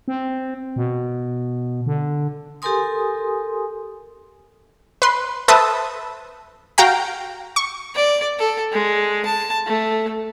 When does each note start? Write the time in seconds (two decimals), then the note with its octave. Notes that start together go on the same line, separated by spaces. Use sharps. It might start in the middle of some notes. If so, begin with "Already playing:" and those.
0.08 C4
0.76 B2
1.86 D3
2.62 G4 A4 A#4 G#5 C6 D#6
5.02 B4 C6
5.48 A4 B4 C5 E5 A5 D#6
6.78 F#4 F5 G5 A#5
7.56 C#6
7.95 D5
8.39 A4
8.72 G#3
9.25 A5
9.67 A3